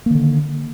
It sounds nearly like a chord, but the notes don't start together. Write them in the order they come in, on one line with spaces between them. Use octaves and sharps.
A#3 D#3 D3